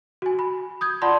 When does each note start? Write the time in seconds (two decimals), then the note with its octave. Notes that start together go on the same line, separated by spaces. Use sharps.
0.22 F#4 G#5
0.39 B5
0.81 D#6 G6 G#6
1.02 F4 D5 F#5 A5 B5 C6